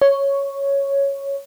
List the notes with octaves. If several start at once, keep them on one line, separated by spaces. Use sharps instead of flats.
C#5